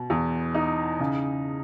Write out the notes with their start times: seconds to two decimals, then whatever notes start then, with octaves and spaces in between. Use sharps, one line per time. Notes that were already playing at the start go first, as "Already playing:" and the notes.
Already playing: B2
0.10 E2
0.55 D#4
1.00 C#3